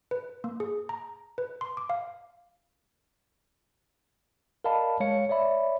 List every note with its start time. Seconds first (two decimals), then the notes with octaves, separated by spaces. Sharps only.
0.11 B4
0.44 A#3
0.60 G#4
0.89 A#5
1.38 B4
1.61 C6
1.77 D6
1.90 F5
4.64 A#4 D5 D#5 F5 A5 B5
5.00 G#3 C#5 F5 C#7
5.29 C#5 D5 E5 B5